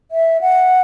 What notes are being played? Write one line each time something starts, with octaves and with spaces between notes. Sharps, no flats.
E5
F#5